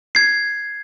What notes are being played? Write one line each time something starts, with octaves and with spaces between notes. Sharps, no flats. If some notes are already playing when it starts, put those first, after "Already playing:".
G#6 C7